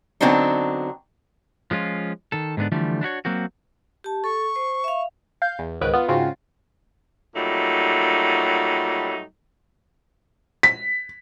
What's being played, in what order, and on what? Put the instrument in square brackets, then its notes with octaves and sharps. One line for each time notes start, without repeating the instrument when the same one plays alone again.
[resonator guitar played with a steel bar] D3 F#3 B3 C4 D4 D#4
[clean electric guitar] F3 G#3 C#4 F4
D#3 A4
G#2 D3 B3 D4
D3 E3 F3 G3 A3
D4 E4 F#4 C#5
F#3 A#3 C4 F#4
[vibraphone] G4 A5
[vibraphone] A4 [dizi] C#6
[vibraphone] C5
E5 F5
[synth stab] F5 G6
E2
C#2 G#2 D#3 B4 D7
B3 F4
G#2 C#3 C4 F4 F#4
[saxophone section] A#2 F#3 G3 A3 D#4
[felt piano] B6